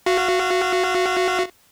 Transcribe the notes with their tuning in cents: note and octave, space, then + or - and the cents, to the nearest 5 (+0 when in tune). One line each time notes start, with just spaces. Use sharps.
F#4 -10 F5 -30